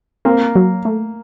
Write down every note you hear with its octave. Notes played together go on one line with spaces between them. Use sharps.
A#3 C4
F#3
A3